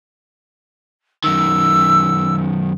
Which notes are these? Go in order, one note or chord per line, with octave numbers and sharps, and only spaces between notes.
F#2 D#3 E6